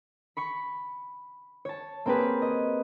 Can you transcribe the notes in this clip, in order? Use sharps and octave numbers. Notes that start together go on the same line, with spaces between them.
B5 C#6 C#7
C#5 A5
A#3 C4 G4 G#4 B4
D#5